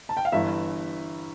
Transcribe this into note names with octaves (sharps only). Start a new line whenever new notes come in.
A5
G5
F5
G1 G2 E3 E5